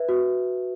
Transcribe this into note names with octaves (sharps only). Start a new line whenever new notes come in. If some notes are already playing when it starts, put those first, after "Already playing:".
Already playing: B4 E5
F#4